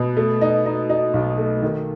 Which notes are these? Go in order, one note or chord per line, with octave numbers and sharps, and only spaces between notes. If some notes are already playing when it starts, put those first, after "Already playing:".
Already playing: B2
A3
D#4
D#4
D#4
B1
A3
D#3